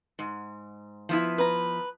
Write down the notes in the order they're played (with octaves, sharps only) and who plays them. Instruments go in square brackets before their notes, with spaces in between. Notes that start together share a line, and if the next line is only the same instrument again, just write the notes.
[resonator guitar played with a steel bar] G#2
F3 B3 E4
[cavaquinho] B4 A#5